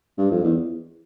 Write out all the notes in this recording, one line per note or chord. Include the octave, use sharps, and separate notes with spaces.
G2
F2
E2